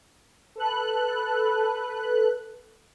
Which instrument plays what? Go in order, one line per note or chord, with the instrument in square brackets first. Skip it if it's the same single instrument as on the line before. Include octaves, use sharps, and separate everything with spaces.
[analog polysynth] A4 B4 F#6